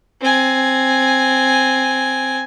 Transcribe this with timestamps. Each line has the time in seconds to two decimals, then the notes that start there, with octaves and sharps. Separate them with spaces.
0.21 C4 G#5